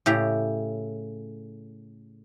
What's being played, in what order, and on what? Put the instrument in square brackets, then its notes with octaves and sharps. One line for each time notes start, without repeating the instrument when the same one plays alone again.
[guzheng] A2 C#3 G4 A#5